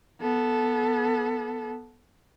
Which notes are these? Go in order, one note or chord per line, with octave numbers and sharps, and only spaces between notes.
B3 A4